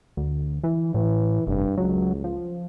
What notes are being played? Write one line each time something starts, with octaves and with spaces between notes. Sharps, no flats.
D2
E3
A2 E3
F1 G2
C#2 F#3
F3